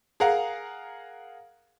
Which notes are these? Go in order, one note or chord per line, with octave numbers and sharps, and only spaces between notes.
G#4 A#4 F5 F#5 A#5